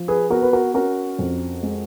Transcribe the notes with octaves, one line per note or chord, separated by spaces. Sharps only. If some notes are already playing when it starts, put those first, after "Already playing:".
Already playing: F3
G#4 B4
B3 F#4 A#4
B4
F#4 A#4
C#4 F#4 A#4
F2
G#3